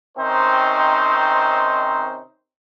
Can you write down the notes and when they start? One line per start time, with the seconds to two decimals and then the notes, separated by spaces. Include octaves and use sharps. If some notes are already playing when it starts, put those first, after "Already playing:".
0.18 C3 D#3 C4 C#4 D#4 C5